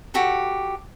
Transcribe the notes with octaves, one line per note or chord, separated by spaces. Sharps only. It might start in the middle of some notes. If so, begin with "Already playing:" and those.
F#4 G4 A4